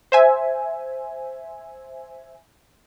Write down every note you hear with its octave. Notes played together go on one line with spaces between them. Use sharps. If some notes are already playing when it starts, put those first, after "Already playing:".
C5 E5 G#5